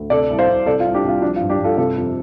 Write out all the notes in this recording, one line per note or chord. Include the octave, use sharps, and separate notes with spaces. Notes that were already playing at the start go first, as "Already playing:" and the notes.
Already playing: D2
C3 A4 D5
C2
C5 F5
C2
C3 A4 D5
F4
C2
D4 G4
C2 F4
F3 D4
F4
G2
D4 G4
G2
F4 A4
C3 F4 A4
F2